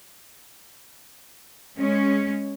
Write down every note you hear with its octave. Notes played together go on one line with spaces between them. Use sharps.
G#3 C#4